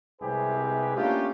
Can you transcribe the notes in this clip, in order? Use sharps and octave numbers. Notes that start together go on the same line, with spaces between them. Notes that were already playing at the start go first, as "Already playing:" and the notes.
C2 G#2 C3 G4 G#4 B4
A3 A#3 C#4 D4 F4 G4